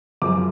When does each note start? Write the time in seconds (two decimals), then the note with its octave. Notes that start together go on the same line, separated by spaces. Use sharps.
0.22 F#2 F3 G#3 D6